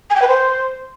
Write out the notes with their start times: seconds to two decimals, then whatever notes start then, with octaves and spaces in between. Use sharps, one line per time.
0.10 G#5
0.16 G5
0.22 B4
0.28 C5